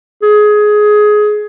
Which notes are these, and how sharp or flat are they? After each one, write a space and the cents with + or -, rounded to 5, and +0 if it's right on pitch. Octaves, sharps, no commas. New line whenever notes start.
G#4 +15